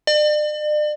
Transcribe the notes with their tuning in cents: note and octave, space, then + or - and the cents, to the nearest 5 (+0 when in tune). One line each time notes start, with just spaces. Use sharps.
D5 +40